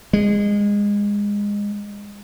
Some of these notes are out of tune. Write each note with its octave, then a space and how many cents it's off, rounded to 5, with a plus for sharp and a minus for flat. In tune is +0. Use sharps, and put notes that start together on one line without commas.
G#3 -20